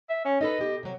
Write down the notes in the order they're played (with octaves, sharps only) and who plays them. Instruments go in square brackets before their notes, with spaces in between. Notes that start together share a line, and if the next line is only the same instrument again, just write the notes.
[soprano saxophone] E5
C#4
[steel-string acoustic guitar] D#4 A4 B4 [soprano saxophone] D#5
[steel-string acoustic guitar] B2 G4
C3 F#3